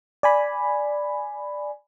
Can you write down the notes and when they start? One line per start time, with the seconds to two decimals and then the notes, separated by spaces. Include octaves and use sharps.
0.23 D5 G#5 B5